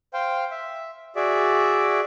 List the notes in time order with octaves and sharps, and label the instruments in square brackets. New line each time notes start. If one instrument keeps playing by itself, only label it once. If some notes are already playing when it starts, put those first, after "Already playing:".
[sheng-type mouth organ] C5 F5 G5
E5
F#4 G#4 D5 E5